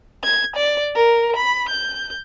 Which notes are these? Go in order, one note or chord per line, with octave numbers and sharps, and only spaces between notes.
G#6
D5
A#4
B5
G6